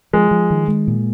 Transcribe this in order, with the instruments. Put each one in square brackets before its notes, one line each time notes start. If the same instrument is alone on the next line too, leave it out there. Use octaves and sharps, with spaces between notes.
[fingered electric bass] F3 [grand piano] G#3
[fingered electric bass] F3
D#3
G#3
A#2